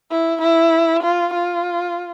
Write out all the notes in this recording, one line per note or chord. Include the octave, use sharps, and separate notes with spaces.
E4
E4
F4
F4